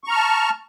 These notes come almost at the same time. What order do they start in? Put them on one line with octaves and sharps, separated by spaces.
C#6 A#5 F6 A5